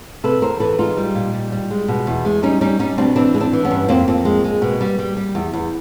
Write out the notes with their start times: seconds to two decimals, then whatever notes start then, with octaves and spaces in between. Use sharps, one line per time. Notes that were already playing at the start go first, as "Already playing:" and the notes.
0.24 C3 A4 B4
0.42 E2 A#4 C5
0.60 E3 A4 B4
0.78 G#3 D#4 F4
0.97 G3
1.15 A#2
1.34 G3
1.52 G3
1.70 G#3
1.88 B2
2.07 E2
2.25 G#3
2.43 G3 C#4 D#4
2.61 G3 C#4 D#4
2.79 G3 C#4 D#4
2.98 B2 C4 D4
3.16 E3 C4 D4
3.34 G#3
3.40 C4 D4
3.53 E3
3.65 B3 C#4
3.71 G2
3.89 F2 A#3 C4
4.08 F2
4.25 G#3
4.44 G#3
4.62 B2
4.81 G3
4.99 G3
5.17 G3
5.35 E2
5.53 E2